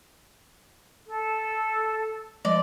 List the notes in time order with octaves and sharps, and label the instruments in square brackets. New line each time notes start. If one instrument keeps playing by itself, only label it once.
[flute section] A4
[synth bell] F3 G#3 D#5 [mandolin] D5